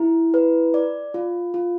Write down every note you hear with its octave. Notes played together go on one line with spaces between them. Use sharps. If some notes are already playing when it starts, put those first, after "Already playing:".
Already playing: E4
B4
D5
F4
F4